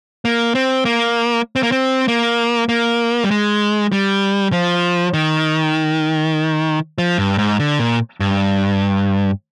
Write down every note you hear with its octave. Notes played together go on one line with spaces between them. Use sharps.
A#3
C4
A#3
C4
A#3
C4
A#3
A#3
G3
G#3
G3
F3
D#3
F3
G2
G#2
D3
A#2
G2